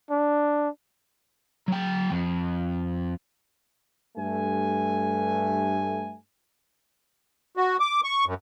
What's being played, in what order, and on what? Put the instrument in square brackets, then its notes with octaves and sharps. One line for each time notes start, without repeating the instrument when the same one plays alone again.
[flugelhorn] D4
[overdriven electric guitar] F#3 G5
F2
[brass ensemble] G2 A3 G#5
[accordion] F#4
D6
C#6
F#2